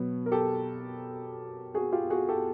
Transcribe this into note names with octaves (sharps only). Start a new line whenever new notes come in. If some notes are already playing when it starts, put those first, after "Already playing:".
Already playing: B2 F#3 B3
A#4
G4 A4
F#4 G#4
F4 G4
F#4 G#4
G4 A4